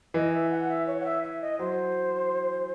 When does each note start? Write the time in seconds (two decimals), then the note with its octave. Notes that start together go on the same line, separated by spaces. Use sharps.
0.14 E3 D#5
0.33 E5
0.51 F#5
0.69 E5
0.87 C#5
1.00 F#5
1.05 E5
1.23 E5
1.42 D#5
1.59 F#3 C5